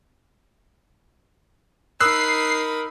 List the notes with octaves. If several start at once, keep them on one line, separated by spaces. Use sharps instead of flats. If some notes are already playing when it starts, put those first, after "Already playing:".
D#4 A#4 B5 D#6 E6 F#6 C7